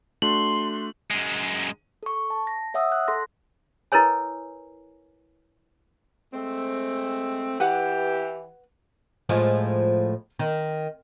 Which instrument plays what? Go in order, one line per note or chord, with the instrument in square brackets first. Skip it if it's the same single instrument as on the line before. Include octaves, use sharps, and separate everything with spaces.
[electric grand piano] A3 D4 F#4 [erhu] C6 [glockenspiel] F#7
[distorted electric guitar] F#2 G#3
[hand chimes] A4 C#6
A5
A#6
C#5 E5 F#5 D#6 E6
F#6
A4 C6 A#6
[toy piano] E4 A#4 B4 C#5 G#5
[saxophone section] G#3 A3 C4
[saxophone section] E3 G4 [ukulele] B4 F#5
[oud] A2 F3 G#3
D#3